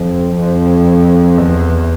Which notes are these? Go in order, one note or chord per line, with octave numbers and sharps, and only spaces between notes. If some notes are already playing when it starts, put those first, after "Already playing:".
Already playing: F2
F2
E2